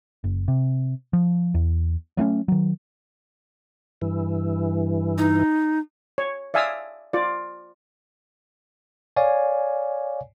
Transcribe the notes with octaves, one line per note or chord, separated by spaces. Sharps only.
F#1
C3
F3
E2
F#3 A3 C4 C#4
D#3 F#3
G2 E3
D#4
C#5
D5 E5 F5 G#5 D#6 E6
F4 D5
C#5 D5 F5 G#5